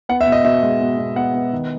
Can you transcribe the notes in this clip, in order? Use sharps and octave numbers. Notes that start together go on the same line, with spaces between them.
B3 F#5
E5
B2
D#5
B2 E5
G#3
B2
B2
B3 F#5
B3
D#3